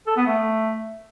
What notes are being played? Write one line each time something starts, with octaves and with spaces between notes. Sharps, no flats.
A4
B3
A3